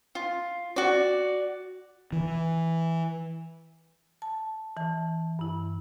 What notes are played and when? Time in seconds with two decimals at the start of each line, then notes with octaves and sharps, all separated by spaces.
0.15 F4
0.76 F#4 D5
2.12 E3
4.22 A5
4.77 E3 A5
5.39 G2 E4